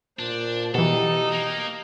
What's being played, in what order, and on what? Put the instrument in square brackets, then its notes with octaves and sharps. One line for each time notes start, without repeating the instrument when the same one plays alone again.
[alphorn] A#2 [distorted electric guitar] D4 [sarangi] C5
[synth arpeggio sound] B2 E3 [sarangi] D#4 [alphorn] G4 [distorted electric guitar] A4
[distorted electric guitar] A#3